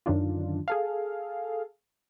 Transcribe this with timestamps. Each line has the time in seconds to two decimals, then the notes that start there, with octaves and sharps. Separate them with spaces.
0.06 F#2 D3 D#3 D4 F4
0.68 G#4 A4 F5